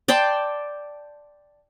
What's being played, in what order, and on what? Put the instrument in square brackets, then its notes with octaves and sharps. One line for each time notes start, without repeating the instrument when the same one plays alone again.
[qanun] D5 G5 A5 C6